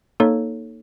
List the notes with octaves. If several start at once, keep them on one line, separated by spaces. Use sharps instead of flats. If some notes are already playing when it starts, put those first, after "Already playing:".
A#3 D#4 A4 C#5